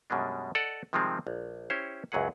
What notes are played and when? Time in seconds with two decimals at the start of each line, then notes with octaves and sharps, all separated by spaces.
0.10 F#2 B2 G3 G#3 D4
0.55 A4 D5 D#5 F#5
0.93 C3 D#3 F3 G3 G#3 C4
1.27 A#1
1.70 C#4 E4 G4 C5 C#5
2.12 C#2 F#2 F#3 G#4 F#5